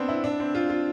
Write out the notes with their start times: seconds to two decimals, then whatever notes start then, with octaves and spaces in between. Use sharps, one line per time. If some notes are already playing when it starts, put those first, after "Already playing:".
Already playing: B3 C4 D4
0.09 E4
0.24 D4
0.40 C4
0.55 F4
0.70 F4